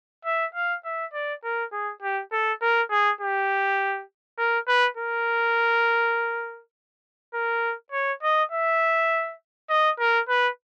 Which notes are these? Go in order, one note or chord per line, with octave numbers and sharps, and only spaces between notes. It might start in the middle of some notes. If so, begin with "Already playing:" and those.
E5
F5
E5
D5
A#4
G#4
G4
A4
A#4
G#4
G4
A#4
B4
A#4
A#4
C#5
D#5
E5
D#5
A#4
B4